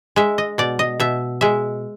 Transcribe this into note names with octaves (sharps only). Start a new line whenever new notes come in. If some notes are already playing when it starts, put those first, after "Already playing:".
G#3 E5
D#5
B2 D5
D#5
B2 E5
G#3 E5